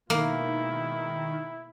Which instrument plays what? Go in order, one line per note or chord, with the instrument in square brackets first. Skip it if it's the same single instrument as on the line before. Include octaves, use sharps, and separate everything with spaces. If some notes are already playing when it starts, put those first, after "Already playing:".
[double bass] B2 G#3 [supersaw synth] D#3 [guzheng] A#3 [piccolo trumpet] E4